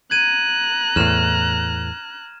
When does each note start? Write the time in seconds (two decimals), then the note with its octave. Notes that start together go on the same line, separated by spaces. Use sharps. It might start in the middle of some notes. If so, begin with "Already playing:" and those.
0.11 A#5 F#6 G#6 D#7
0.96 E2 A2 F6 E7